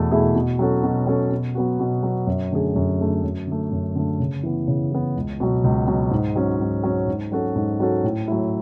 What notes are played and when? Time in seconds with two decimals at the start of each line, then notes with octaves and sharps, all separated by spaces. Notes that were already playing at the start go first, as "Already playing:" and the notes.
Already playing: E2 B2 A3 E4 G#4
0.11 B2 A3 E4 G#4
0.35 B2
0.59 F#3 C#4 F#4 A4
0.83 B2
1.07 F#3 C#4 F#4 A4
1.31 B2
1.55 F#3 B3 F#4
1.79 B2
2.03 F#3 B3 F#4
2.27 F#2
2.52 D3 A3 C#4 G#4
2.76 F#2
2.99 D3 A3 C#4 G#4
3.24 F#2
3.47 D3 A3
3.72 F#2
3.95 D3 A3
4.20 C#3
4.43 E3 B3
4.68 C#3
4.92 E3 B3
5.16 C#2
5.40 B2 F#3
5.64 C#2
5.87 B2 F#3
6.11 G#2
6.36 F#3 C#4
6.59 G#2
6.84 F#3 C#4
7.07 G#2
7.31 F#3 C#4 F#4 A4
7.55 G#2
7.80 F#3 C#4 F#4 A4
8.04 A2
8.28 F#3 A3 E4